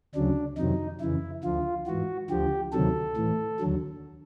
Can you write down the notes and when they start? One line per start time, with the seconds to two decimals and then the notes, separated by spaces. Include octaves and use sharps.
0.15 D2 C#3 F#3 D4
0.57 F2 C3 D#3 F#3 D#4
1.00 F2 C#3 E3 E4
1.44 D2 D3 F3 F4
1.87 G#2 E3 F#4
2.30 D2 D3 F3 G4
2.73 D2 C3 D#3 F#3 A4
3.17 A2 E3
3.60 D#2 D3 F#3